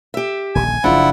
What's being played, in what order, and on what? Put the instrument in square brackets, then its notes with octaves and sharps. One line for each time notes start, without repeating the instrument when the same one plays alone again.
[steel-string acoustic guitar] G4 E5
[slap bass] D#1 A#1 D3 [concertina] G#5
[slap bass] F#1 C#3 F3 [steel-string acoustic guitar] D4 F4 [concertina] E4 F#5